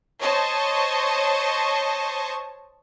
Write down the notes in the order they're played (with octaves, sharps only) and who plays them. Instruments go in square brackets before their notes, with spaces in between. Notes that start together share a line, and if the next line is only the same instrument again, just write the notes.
[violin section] C5 C#5 D#5 A5 C#6